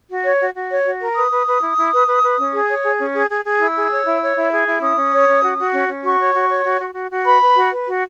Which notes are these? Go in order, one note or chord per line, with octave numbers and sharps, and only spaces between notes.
F#4
C#5
F#4
F#4
C#5
F#4
A#4
B4 D#6
B4
B4
E4
E4
B4
B4
B4
C#4
G#4
C#5
G#4
C#4
G#4
G#4
G#4
E4 E6
G#4
C#5
E4
C#5
E4
G#4
E4
C#4 D#6
C#4
C#5
C#4
F#4
F#4
C#4
C#4
F#4 C#6
C#5
F#4
C#5
F#4
F#4
F#4
F#4
B4 B5
B4
F#4
B4
F#4